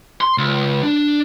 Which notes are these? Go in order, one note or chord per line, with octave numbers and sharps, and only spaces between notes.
C6
C#2
D4